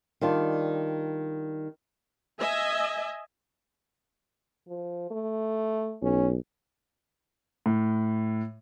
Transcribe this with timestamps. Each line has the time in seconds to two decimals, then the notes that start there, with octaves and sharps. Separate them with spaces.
0.21 D#3 G3 D4 F4
2.40 D#5 E5 G#5
4.68 F3
5.11 A3
6.02 B1 C#4
7.66 A2